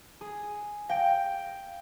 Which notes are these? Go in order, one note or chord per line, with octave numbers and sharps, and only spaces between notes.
G#4
F5 G5 D7